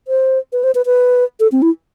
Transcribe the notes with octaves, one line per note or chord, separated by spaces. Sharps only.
C5
B4
C5
B4
B4
A4
C4
E4